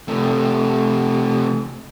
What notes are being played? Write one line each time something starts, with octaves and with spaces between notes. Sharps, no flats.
C3 A3